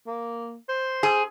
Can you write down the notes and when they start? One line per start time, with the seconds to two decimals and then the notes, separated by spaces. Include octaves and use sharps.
0.07 A#3
0.69 C5
1.03 G#4